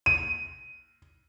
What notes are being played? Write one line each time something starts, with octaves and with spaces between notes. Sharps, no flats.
D#7